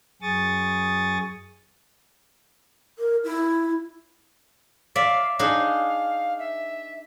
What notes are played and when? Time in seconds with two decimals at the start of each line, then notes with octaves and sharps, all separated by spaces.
0.22 F#2 G#4 C#6 D#6 A6
2.99 A#4
3.24 E4
4.95 D5 E5 F5
5.39 D4 D#4 G#4 F5
6.39 E5